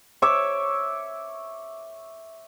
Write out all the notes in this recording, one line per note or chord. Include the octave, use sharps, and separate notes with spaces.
C#5 E5 D6